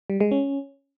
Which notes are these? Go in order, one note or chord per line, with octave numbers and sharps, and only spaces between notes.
G3
G#3
C#4